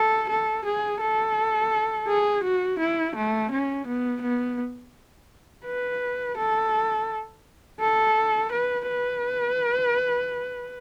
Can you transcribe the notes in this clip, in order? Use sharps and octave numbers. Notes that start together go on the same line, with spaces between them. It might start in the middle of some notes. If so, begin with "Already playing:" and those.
Already playing: A4
A4
G#4
A4
G#4
F#4
E4
A3
C#4
B3
B3
B4
A4
A4
B4
B4